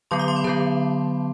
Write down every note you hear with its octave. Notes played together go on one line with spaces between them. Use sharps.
D3 F#3 B3 C6
D6
C6
B5
D3 F#3 B3 A5